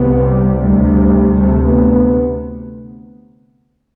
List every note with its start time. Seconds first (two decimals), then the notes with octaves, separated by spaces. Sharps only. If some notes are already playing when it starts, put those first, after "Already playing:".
Already playing: C2 C3 B3
0.23 G3
0.60 D2 C3 G3
1.32 D2 C3 A3
1.67 B3